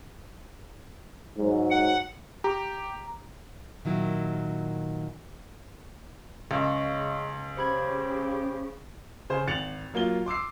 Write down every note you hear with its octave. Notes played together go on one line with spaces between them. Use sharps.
G#2 F#3
F#5
G4 A#5 D6
A#2 D#3 F#3 E4
C#2 C#3 G#4 D#5 C#6
C#3 G4 C5 B5 G#6
C#3 C5
G#1 A6 C#7 F7 F#7
F#3 A#3 F4 G7
C6 D6 E6 C7